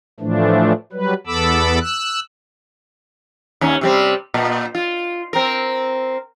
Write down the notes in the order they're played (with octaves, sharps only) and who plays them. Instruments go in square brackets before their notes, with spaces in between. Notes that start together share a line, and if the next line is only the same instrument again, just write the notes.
[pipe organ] A2 E3 F3 A3 D4
F#3 G3 B4
E2 B3 A4 B5 D6 E6
E6 F#6
[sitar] D#2 C#4
C3 G3 C4
A#2
F4
C4 A#4